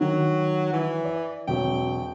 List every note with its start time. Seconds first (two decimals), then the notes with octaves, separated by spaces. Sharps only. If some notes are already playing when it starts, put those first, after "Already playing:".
0.01 D#3 F#3
0.73 E3
1.05 D5
1.48 E1 F#3 C4 G5